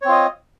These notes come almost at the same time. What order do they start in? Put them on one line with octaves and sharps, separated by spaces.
C#5 C4 F4 D#5